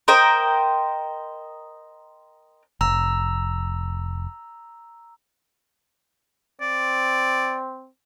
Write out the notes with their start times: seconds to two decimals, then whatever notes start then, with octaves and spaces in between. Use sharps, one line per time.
0.08 A#4 C5 D#5 G5
2.81 F1 A#5 E6
6.61 C4 D5